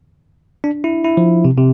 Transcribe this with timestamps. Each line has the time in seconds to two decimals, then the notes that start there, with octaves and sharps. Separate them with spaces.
0.64 D4
0.84 E4
1.04 E4
1.17 F3
1.45 C3
1.57 C3